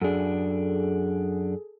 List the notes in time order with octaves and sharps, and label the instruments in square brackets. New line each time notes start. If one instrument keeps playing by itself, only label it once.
[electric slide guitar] F#2 D4 [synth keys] G#4 A4